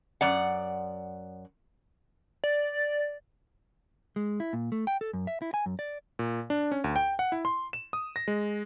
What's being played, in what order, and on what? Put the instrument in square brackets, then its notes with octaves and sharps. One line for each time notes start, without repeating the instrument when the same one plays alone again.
[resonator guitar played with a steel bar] F#2 D5 F#5
[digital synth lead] D5
[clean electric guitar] G#3
E4
A#2
A3
G5
A4
F#2
E5
E4
G#5
F#2
D5
[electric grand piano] A#2
D4
C#4
D2
G5
F#5
E4
C6
E7
D#6
A#6
G#3